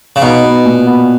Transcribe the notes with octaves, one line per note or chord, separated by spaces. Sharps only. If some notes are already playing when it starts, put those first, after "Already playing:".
C#3
B2 D#4
B3
A#2
B3